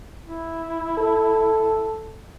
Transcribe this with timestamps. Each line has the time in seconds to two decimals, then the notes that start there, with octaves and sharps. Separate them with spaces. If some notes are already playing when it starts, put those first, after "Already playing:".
0.25 E4
0.97 A4